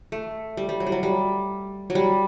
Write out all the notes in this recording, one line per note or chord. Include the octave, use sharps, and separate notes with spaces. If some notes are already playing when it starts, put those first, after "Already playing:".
A3
G3
G3
F#3
G3
F#3
G3
F#3
G3